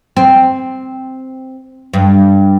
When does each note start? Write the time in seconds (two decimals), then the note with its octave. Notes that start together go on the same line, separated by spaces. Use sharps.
0.17 C4
1.94 G2